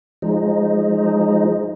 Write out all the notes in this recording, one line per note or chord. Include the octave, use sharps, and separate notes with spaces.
F3 G#3 D#4